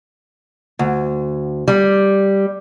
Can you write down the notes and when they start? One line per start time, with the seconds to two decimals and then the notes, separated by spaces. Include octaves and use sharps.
0.79 D2
1.68 G3